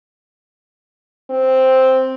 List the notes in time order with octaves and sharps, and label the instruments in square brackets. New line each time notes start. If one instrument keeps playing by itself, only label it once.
[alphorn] C4